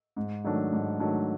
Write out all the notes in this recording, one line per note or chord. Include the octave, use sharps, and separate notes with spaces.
G#2
D#3 F#3 A3 D4
G#2
D#3 F#3 A3 D4